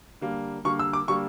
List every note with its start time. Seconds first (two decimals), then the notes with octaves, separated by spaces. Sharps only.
0.21 D3 G3 A#3
0.65 D3 G3 A#3 C#6
0.79 E6
0.93 D6
1.08 D3 G3 A#3 C#6